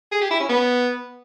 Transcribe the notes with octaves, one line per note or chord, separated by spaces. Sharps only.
G#4
G4
E4
C#4
B3